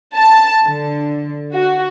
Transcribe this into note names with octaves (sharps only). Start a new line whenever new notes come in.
A5
D3
F#4